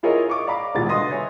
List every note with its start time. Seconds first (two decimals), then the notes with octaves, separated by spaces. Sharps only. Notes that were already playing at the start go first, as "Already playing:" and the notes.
0.03 E4 F4 G#4 A#4 C#5 D#5
0.30 C#6 D6
0.47 D5 F5 A#5 B5 D6
0.74 D#1 C2 B2 G#3 F4 A6
0.89 D3 B4 D#5 C6 D#6 A#6
1.10 C#5 E5 G#5